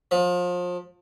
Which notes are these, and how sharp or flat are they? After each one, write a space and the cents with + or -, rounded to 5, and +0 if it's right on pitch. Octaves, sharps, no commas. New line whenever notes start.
F3 +30